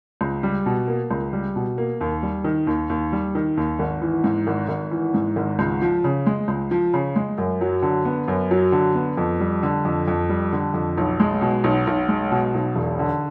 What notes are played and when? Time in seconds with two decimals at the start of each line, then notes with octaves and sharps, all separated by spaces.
0.21 C#2
0.43 G3
0.66 B2
0.88 A#3
1.11 C#2
1.33 G3
1.56 B2
1.78 A#3
2.01 D#2
2.23 G3
2.44 D#3
2.67 D#2
2.90 D#2
3.13 G3
3.35 D#3
3.57 D#2
3.79 G#1
4.02 E3
4.24 G#2
4.47 G#1
4.69 G#1
4.91 E3
5.14 G#2
5.36 G#1
5.59 C#2
5.82 F3
6.04 C#3
6.26 G#3
6.48 C#2
6.71 F3
6.94 C#3
7.16 G#3
7.38 F#2
7.61 F#3
7.82 D3
8.05 B3
8.28 F#2
8.51 F#3
8.72 D3
8.95 B3
9.17 F2
9.40 G3
9.63 D3
9.85 F2
10.08 F2
10.29 G3
10.52 D3
10.74 F2
10.97 B1
11.20 G#3
11.42 B2
11.64 B1
11.87 B1
12.08 G#3
12.31 B2
12.54 B1
12.76 E1
12.99 D3